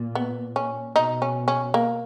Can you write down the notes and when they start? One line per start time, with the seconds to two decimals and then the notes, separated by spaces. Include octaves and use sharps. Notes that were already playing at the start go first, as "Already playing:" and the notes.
Already playing: A#2
0.15 B3
0.56 C#4
0.95 B2 D#4
1.22 C#4
1.48 C#4
1.74 A#3